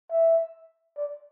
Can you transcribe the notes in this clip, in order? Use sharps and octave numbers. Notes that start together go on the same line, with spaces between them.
E5
D5